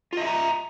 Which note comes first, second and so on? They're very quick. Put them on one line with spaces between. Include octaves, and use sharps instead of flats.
F4 D#5 E5 A#5